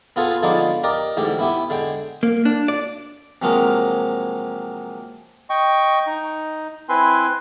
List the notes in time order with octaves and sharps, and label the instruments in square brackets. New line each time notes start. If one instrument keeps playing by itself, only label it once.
[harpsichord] B3 F4 G#4 A4 B4
D3 F3 G#3 B3 D#4 D5
G4 A#4 D5 D#5
A1 G#2 D3 G4
B3 E4 G4
D3 G#3 G5
[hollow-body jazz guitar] A#3
D4
D5
[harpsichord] C3 F3 F#3 G#3 A#3
[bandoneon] D#5 G5 C#6
D#4
C4 E4 B4 G#5 C6